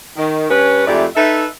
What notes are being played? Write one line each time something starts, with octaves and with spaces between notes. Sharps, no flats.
D#3
G2 C#4 B4
F2 G#2 A3 E4 G4 D5
D#4 A4 B4 E5